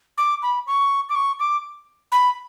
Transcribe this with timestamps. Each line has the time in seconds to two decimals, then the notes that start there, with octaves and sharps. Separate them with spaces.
0.18 D6
0.42 B5
0.67 C#6
1.09 D6
1.15 C#6
1.39 D6
2.12 B5